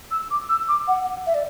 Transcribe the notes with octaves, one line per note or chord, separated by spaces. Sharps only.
E6
D6
E6
D6
F#5
E5
D5